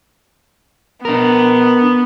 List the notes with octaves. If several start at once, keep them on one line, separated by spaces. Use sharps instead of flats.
B3 D4 A#4